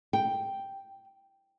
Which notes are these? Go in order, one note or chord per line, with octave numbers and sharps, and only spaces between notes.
G5